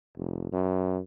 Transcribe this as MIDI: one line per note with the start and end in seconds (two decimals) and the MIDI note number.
0.17 0.48 29
0.52 0.99 42